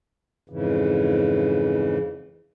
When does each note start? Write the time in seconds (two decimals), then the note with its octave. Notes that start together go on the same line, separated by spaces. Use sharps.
0.50 F2 G#2 C#3 E3